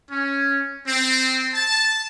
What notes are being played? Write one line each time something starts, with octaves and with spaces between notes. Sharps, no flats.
C#4
C4
A5